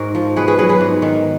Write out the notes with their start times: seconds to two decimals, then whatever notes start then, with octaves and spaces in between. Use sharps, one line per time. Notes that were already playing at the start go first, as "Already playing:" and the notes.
Already playing: G#2 F#4 G#4 A#4
0.15 F3
0.36 B2 G#4 B4
0.48 G#4 B4
0.58 F#3 G#4 B4
0.69 G#4 B4
0.81 G#2
1.02 D#3